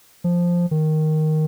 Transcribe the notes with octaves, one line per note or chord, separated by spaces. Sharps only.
F3
D#3